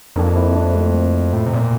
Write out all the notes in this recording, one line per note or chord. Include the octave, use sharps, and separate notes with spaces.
F2 A#3 D4
C4 E4
A#3 D4
A3 C4
A2
C3
A#2